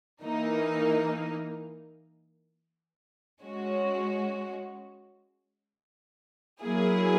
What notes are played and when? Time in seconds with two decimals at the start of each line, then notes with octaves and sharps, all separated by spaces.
0.22 E3 A#3 D#4
3.41 G#3 C#4 F#4
6.61 F#3 A#3 E4 G#4